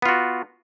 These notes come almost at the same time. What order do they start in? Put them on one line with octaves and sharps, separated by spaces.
B3 F4 F#4